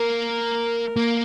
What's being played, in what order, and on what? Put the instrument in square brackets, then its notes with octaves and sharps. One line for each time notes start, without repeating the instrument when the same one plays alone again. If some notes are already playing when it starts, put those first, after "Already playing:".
Already playing: [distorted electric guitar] A#3 [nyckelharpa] A#4
[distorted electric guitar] A#3